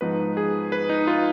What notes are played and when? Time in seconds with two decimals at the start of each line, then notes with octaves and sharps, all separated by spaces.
0.01 G#2 F3 B3 D#4 B4
0.37 G#4
0.72 B4
0.89 D#4
1.07 F4